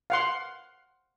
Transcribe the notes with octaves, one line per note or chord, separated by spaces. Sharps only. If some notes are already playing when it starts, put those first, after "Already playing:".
F5 F#5 C6